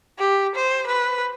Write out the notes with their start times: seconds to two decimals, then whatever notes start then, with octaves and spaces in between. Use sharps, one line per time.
0.18 G4
0.55 C5
0.87 B4